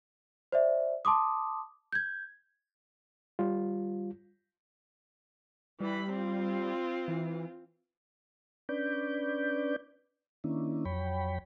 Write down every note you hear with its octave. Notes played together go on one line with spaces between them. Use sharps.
C5 D5 E5
A5 C6 D6 D#6
G6 G#6
G3 F4
E3 G3 B5
C4 F4
E3
C#4 D4 B4 D5 G6
D#3 A#3 C#4 D4 E4
F2 F#3 C#5 G5 B5